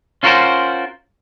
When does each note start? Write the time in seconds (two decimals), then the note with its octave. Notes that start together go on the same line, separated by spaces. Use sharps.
0.23 C#4 F4 F#4 A4 A#4 C5